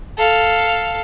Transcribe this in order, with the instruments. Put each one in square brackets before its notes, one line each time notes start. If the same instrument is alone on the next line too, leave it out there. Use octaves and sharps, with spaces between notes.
[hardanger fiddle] A4 F5